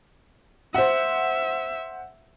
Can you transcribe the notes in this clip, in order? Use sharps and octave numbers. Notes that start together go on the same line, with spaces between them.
C5 E5 F#5